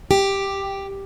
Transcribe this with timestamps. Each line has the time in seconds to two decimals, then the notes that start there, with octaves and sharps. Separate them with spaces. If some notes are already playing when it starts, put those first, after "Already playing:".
0.11 G4